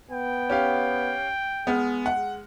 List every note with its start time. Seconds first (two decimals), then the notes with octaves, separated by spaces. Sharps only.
0.11 B3 G5
0.50 C#4 G4 F5
1.67 G#3 B3 G#4 F6
2.06 F#5